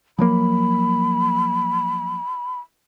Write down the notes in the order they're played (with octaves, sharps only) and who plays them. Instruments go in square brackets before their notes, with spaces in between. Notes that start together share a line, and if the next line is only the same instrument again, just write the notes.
[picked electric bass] F3 F#3 A#3 [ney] B5